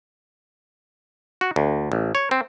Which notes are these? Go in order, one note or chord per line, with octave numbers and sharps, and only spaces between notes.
F#4
D2
A1
C#5
C4